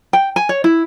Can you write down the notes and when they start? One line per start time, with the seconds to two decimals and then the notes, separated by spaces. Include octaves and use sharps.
0.13 G5
0.36 G#5
0.49 C#5
0.64 E4